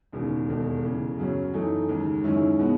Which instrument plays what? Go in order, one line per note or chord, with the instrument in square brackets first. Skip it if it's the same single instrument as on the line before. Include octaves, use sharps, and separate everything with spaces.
[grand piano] E1 D#2 C#3
E1 D#2 D#3 A3
D#2 C#3 E3
F#2 C#3 F#3 C#4
F#2 E3 A3 D#4
D#2 C#3 G#3
F#2 D#3 G#3 C#4 E4
B2 G#3 B3